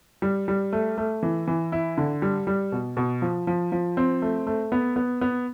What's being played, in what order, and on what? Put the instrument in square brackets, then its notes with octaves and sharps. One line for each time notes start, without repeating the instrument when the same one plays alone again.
[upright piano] G3
G3
A3
A3
E3
E3
E4
D3
G3
G3
B2
B2
F3
F3
F3
C4
A3
A3
B3
B3
B3